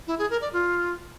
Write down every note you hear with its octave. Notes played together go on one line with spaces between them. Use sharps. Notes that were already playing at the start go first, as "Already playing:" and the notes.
E4
G#4
A#4
D5
F4